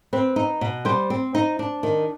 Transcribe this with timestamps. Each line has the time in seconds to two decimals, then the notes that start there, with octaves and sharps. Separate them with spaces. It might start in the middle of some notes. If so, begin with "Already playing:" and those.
0.13 C4 B4
0.36 D#4
0.61 B2
0.85 G3 C5
1.10 C4
1.35 D#4
1.59 D4
1.83 D#3